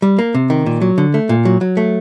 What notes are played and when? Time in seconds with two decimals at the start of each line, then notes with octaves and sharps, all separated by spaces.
0.02 G3
0.19 A#3
0.34 C3
0.50 D#3
0.66 A#2
0.81 F#3
0.98 D3
1.14 A3
1.29 A#2
1.45 F#3
1.61 F#3
1.77 A3